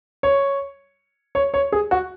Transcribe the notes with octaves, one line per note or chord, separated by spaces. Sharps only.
C#5
C#5
C#5
G#4
F#4